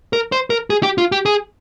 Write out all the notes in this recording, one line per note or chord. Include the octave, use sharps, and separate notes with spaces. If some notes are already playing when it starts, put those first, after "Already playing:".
A#4
C5
A#4
G#4
G4
F4
G4
G#4